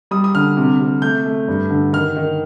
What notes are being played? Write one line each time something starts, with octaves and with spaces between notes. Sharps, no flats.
G3 D#6
D#6
D3 F6
C3
C3
A3 G6
A3
G2
D3
D#3 F6
D#3